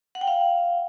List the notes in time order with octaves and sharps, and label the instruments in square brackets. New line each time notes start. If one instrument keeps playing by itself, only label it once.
[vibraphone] F#5
G5
F5